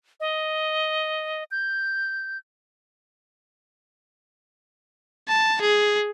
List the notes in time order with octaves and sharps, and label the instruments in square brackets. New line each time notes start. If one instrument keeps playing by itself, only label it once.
[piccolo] D#5
G6
[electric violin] A5
G#4